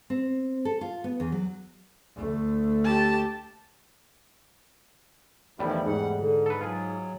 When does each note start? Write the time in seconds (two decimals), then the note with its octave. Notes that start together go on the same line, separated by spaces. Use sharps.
0.10 C4
0.65 A4
0.81 F4
1.04 B3
1.20 E2
1.32 F#3
2.15 D2 A3
2.84 G4 A5
5.59 E2 A2 D#3 F3 G3 E4
5.86 G#2 F#5
6.16 D3
6.46 A4 B4
6.61 F#3 F4 G#4